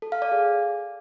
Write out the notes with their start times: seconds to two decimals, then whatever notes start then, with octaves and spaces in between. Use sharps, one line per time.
0.02 A4
0.12 F5
0.22 D5
0.32 G#4